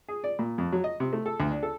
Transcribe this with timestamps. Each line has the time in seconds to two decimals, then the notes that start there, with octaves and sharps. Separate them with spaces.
0.08 G#4
0.24 D5
0.39 A#2
0.58 F2
0.72 F#3
0.84 D#5
1.00 C3
1.13 A3
1.26 A4
1.40 D2
1.51 D4
1.63 A4